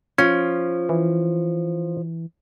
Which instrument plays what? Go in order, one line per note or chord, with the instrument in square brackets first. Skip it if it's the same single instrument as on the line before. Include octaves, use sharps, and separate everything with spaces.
[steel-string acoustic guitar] F3 [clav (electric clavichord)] C#4
[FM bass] E3